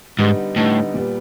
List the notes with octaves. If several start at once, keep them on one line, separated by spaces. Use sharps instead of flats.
G#2 D3 G3 B3 D#4
A2 D3 G3 B3 D#4
A#2 G3 B3